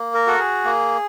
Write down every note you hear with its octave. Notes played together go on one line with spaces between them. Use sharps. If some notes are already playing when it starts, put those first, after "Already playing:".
Already playing: A#3
A#4
F#4 A4
G#4
A#3